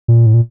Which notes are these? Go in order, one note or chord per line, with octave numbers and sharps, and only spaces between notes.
A#2
A2
A#2